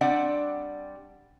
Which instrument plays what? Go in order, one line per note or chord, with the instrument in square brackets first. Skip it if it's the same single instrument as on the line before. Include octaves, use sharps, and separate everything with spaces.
[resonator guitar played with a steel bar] G3 C4 D4 D5 F#5